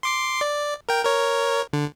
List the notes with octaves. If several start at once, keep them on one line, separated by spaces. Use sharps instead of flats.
C6 D6 C7
D5
A#4 G5
A#4 C#5
D3